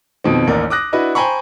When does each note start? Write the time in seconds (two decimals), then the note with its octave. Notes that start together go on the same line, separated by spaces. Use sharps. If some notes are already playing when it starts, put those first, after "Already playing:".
0.24 F2 B2 D#3 C4
0.47 A1 D#2 A#4 D5
0.70 D6 D#6 F#6 A#6
0.93 D4 E4 F#4 B4 D#5
1.15 C5 G5 G#5 A#5 B5 C#6